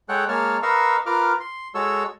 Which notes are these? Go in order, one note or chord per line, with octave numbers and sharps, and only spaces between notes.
G#3 A4 C#5 F#5 G5 F#6
G#3 A#3 C#5 A5 F6
A#4 B4 D#5 F5 C#6 E6
F4 A#4 B4 D6 F6
C6
G#3 F#4 A4 C#5 E6